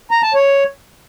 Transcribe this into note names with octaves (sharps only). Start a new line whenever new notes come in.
A#5
A5
C#5